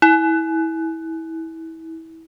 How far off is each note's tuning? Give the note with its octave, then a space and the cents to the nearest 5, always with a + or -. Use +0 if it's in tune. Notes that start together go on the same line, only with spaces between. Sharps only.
E4 -25